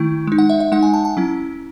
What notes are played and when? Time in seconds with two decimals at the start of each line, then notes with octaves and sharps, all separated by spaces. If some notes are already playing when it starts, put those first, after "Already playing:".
Already playing: D#3 A3 E4
0.27 G#3 D#4
0.38 F#5
0.50 E5
0.60 E5
0.72 G#3 D#4 F#5
0.83 G#5
0.94 A5
1.05 A5
1.17 F#3 C#4 E4